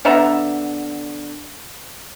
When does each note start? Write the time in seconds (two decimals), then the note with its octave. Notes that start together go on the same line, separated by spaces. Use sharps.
0.05 D3 B3 E5 A#5